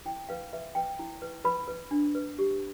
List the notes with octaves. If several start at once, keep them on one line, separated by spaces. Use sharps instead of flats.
E4 G5
B4 F5
B4 E5
B4 G5
E4
B4
B4 B5
B4
D4
B4
G4